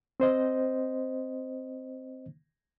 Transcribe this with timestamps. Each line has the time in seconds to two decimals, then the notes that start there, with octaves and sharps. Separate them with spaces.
0.20 C4 C5 D#5